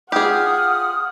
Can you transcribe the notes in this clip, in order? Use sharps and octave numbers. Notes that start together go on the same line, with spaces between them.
F4 G4 G#4 F#5 D#6 F6